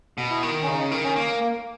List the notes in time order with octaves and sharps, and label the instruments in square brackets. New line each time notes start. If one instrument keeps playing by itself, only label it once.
[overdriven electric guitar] B2
[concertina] E4
[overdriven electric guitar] D#3
[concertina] C#4
[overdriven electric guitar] C#3 [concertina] D#4
[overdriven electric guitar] D#3
[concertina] C#4
[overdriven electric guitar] A#3
[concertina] A#3